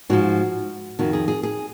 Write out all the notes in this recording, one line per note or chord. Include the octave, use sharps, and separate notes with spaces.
G#2 F3 F#4
F2 D#3 F#4
G#4
G#4
G#4